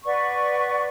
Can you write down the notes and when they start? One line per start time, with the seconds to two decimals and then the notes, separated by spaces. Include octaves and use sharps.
0.04 B4 D5 F#5 C#6